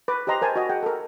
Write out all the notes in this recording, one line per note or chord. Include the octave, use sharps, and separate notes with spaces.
B4 D6
G4 C5 D#5 A#5 C6
A#4 C5 G#5 A5
F#4 D#5
G#4 F#5 G5
A4 A#4